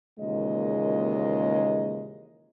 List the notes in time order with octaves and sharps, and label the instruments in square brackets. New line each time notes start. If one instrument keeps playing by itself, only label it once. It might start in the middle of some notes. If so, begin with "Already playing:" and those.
[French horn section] D#2 A#2 C#3 E3 G#3 D#5